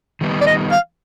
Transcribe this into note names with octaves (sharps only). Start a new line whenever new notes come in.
D#3 G3 B3 D#4
D5
D#5
F5